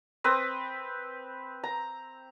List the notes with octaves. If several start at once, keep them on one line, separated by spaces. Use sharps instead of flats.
C4 B4 D#6
A#5